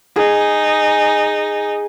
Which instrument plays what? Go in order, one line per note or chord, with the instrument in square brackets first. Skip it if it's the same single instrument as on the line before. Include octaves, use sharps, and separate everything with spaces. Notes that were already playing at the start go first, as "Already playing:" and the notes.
[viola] D#4 [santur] G#4